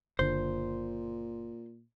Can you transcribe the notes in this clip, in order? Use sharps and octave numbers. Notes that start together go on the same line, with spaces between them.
F#1 A#2 D3 C5